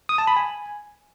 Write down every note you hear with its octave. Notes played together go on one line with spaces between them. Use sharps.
D#6
A5
B5
G#5